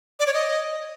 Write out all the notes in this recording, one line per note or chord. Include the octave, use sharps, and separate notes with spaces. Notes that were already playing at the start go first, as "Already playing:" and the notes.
D5
C#5
D#5